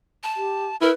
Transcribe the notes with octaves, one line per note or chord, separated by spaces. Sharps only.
A5
G4
E4 A#4 B4